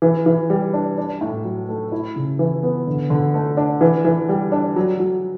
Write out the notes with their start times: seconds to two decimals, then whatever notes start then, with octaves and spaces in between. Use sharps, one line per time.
0.02 E3
0.26 E3
0.50 G3
0.73 D4
0.98 D4
1.21 A2
1.45 F#3
1.69 A3
1.92 E4
2.16 C#3
2.39 E3
2.63 B3
2.87 D3
3.10 D3
3.34 A3
3.57 D4
3.81 E3
4.05 E3
4.29 G3
4.52 D4
4.76 F#3
5.00 F#3